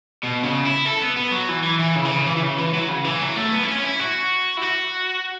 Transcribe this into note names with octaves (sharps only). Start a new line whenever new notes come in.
B2
C#3
E4
A4
B3
B3
F#3
E3
E3
E3
C#3
E3
C#3
E3
E3
C#3
E3
F#3
C#3
E3
F#3
A3
B3
E4
C#4
E4
F#4
E4
F#4